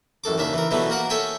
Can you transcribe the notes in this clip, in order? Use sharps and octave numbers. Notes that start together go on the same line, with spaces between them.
A1 F#2 A4 D6
D#2 C#3 D4 E5
E3 A#4
B2 E3 F#3 G3 A3 B3
A#3 F#4 A#4 F#5
A4 C#5 E5 G5 G#5